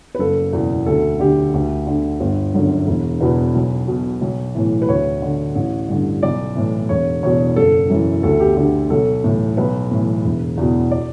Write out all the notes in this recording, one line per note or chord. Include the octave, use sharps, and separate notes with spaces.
B4
F#1 A4
E2 B2
D2 A4
D3 G4
D2
D3
G1
F#2 D3
E1
E2 B2 B4
B1
B2
B1
A2 E3
B4
D2 C#5
D3
A1
G2 D3
B1 D5
A2 E3
E1 C#5
E2 B2 C#5
F#1 A4
F#2 E3
D2 A4
G4
D3 G4
B1 A4
A2 E3
B1 B4
A2 E3
E1
E2 B2
D5